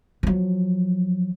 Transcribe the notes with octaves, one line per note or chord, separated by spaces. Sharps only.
F3 F#3